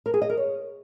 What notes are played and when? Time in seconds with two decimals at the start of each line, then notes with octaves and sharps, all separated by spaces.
0.06 A#4
0.14 G#4
0.22 D#5
0.29 A#4
0.37 C#5